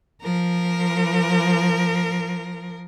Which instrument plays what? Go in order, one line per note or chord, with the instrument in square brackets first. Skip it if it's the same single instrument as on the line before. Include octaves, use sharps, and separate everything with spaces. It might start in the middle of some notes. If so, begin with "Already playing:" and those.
[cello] F3 A#4